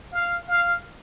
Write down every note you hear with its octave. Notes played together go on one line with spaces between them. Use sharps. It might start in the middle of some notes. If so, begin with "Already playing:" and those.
F5
F5